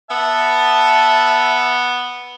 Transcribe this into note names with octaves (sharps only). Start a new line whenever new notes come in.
B3 E5 A5